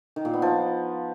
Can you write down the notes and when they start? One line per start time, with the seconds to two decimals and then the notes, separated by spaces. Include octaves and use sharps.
0.16 D#3
0.25 A#2
0.34 B3
0.42 F3